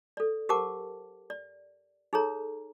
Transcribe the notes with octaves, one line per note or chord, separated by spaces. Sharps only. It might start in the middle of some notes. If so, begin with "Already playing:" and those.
A4 D5
G4 A#4 C5 F#5 A5 D6
D5
D#4 G#4 A4 C#5 A#5